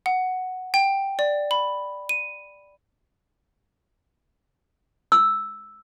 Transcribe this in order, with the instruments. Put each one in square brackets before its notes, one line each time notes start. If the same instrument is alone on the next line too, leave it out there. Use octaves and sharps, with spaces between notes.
[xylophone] F#5
G5
D5
B5
D#7
[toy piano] E6